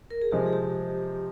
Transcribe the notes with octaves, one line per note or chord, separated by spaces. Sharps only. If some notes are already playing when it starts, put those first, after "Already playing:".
A#4
G#4
C3 F3 G#3 G4
G#4
G4